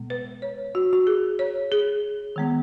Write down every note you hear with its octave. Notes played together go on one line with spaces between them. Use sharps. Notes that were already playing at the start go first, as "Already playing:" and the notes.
Already playing: B2 G#3 B3
B4
C#5
F#4
F#4
G#4
C#5
G#4
D#3 G#3 B3